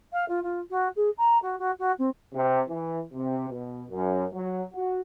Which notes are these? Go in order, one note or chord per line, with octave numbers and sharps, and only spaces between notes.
F5
F4
F4
F#4
G#4
A#5
F#4
F#4
F#4
C4
C3
E3
C3
B2
F#2
F#3
F#4